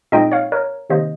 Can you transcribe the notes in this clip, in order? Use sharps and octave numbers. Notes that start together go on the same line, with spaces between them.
A#2 G#3 C4 D#4 D#5 G5
C#5 F5
A#4 C#5
C3 D#3 A#3 C5 D#5